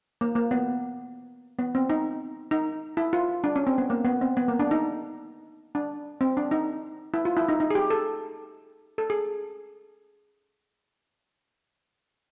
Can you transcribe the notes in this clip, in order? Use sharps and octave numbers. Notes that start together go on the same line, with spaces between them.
A#3
A#3
B3
B3
C4
D#4
D#4
E4
F4
D4
C#4
C4
B3
A#3
B3
C4
B3
A#3
D4
D#4
D4
C4
D4
D#4
E4
F4
E4
D#4
D#4
G#4
G4
A4
A4
G#4